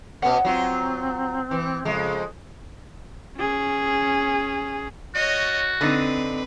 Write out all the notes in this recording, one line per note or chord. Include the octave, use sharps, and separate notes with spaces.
B2 B3 C#4 F#5
F#3 C4 F4
E3
F2 C#3 G#3
C#4 G#4
F#4 C#5 D#5
D3 C4 D#4 B4